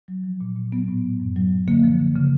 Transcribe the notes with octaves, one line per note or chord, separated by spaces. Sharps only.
F#3
F3
A#2
A#2
F#3 B3
A2
A2
F#2
F#3
F#3
D3 A#3
F3
D3
C#3